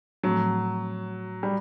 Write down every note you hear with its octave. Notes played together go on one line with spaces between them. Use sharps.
A2 F3 F#3 A3 C4
G3